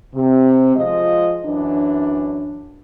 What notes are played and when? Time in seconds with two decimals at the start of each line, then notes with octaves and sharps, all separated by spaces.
0.15 C3
0.76 F3 G#3 F4 D#5
1.45 F#2 E3 D4